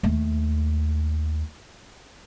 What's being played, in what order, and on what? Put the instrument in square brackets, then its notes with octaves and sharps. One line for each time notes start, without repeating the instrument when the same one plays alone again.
[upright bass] D#2 A3